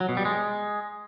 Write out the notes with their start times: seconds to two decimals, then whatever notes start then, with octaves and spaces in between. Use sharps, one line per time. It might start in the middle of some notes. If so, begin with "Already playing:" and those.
0.01 F#3
0.09 B2
0.17 G3
0.25 G#3